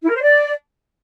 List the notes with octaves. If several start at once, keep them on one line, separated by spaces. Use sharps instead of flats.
E4
A#4
C5
D5